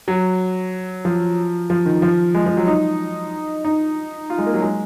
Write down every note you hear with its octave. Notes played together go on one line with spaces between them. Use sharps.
F#3
F3
F3
D#3
F3
G#3
F3
F#3
D#4
D#4
F4
G#3
A#3
F#3
G#3